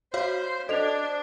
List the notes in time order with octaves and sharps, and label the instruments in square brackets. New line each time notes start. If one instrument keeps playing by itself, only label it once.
[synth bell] F#4 C#5 F5 [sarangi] C5
[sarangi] D4 [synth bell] A4 C5 [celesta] D#5 F7